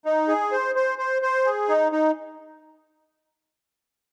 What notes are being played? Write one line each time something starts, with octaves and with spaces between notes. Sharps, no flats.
D#4
G#4
C5
C5
C5
C5
G#4
D#4
D#4